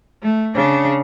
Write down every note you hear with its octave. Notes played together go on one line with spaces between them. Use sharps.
A3
C#3 D4